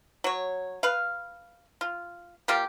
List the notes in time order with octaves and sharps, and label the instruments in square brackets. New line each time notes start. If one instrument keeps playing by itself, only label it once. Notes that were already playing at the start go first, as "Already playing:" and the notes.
[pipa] F#3 C#5
B4 F5
F4
G3 A#3 F4 G4